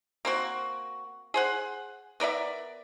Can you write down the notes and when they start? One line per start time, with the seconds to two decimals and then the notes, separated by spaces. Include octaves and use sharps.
0.25 A#3 C4 F#4
1.34 G#4 C5 F#5
2.20 B3 A#4 D5 E5